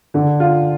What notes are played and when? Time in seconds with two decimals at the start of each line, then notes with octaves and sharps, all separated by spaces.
0.14 D3
0.40 F4